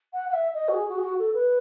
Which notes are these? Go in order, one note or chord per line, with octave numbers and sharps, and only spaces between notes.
F#5
F#5
E5
D#5
F#4
G#4
F#4
G#4
F#4
A4
B4